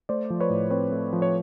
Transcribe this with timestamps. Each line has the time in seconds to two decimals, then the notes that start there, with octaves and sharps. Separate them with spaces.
0.09 A3 C5 D5
0.30 F3
0.40 B4 C#5
0.50 A2
0.70 C4 B4 C#5
0.92 A3
1.13 F3
1.22 C#5